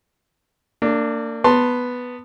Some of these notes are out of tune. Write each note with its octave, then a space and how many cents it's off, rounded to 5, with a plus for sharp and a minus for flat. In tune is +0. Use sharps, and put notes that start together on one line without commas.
A#3 -35 D4 +0
B3 +0 A5 +15 C6 +10